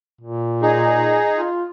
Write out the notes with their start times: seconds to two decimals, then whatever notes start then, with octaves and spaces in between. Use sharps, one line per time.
0.21 A#2
0.62 D#4 G#4
1.36 F4